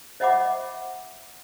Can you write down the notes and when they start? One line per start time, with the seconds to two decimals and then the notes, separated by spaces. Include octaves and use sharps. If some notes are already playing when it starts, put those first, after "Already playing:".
0.20 C5 D#5 E5 F#5 B5 D6